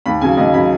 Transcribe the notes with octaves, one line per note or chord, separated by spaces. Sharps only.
D#2 B5
C#3 F#3 G#5
D#2 D#5
C#3 F#3 B5